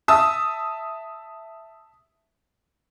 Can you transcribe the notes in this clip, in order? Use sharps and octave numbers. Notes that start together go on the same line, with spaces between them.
E5 A5 D#6 E6